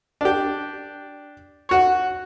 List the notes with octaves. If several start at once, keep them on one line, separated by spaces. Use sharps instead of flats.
D4 G4
F#4 C#5